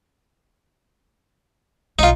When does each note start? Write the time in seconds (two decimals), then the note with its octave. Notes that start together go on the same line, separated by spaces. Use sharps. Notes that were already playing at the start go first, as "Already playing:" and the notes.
1.99 B1 D#4 F4